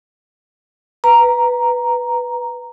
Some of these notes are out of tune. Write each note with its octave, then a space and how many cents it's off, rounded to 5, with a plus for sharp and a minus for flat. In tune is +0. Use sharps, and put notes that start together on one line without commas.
B4 +0 A#5 +0